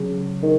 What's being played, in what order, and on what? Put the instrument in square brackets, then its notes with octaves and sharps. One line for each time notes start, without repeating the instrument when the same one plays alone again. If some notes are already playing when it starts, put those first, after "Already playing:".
Already playing: [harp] C#2 C#3 F#3 C#4
[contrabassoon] D#3